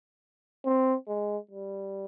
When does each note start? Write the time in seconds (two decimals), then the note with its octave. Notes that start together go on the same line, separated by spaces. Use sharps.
0.66 C4
1.08 G#3
1.51 G3